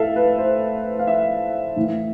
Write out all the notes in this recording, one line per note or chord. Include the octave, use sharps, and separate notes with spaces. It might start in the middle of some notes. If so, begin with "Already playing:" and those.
Already playing: A2 A4 E5 F5
B4
C5
F5
E5
A2 E3